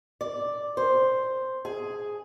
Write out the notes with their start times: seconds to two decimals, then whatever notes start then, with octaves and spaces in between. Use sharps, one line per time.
0.21 D5
0.77 C5
1.65 G#4